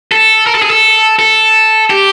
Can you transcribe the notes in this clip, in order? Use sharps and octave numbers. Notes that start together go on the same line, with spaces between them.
A4
A#4
A4
G#4
A4
A4
G4